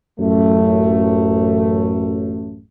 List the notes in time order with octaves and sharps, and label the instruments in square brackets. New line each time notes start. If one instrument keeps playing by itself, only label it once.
[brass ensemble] A1 F#2 A3